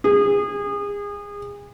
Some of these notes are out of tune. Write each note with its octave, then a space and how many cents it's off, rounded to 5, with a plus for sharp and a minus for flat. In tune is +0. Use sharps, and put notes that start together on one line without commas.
G#4 -30